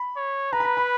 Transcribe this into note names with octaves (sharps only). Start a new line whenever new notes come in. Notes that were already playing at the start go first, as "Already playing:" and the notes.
Already playing: B5
C#5
B4 A#5
B5
A#5
B5